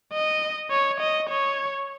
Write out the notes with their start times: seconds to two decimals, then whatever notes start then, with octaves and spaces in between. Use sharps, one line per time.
0.13 D#5
0.71 C#5
1.00 D#5
1.29 C#5